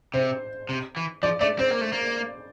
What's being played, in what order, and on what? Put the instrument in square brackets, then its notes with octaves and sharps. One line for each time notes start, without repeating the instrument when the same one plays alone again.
[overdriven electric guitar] C3 [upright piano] C5
[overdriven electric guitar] C3
E3
[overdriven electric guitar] F3 [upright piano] D5
[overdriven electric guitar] A3 [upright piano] D5
[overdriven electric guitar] C4 [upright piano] C5
[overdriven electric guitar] A#3
A3
A#3